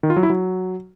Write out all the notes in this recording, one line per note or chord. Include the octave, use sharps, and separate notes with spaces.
D#3
F4
F#3
E4
F#3